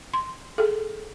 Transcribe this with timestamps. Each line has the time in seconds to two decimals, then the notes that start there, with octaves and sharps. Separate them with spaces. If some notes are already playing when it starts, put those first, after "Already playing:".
0.14 C6
0.58 G#4 A4